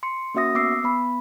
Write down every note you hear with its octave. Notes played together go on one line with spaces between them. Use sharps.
C6 C#7
A#3 C#4 F#4 E5 D#6 A#6
B3 D6 E6 C7
B3 B5